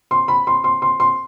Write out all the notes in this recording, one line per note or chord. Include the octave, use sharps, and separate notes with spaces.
C6
B5
C6
C6
C6
C6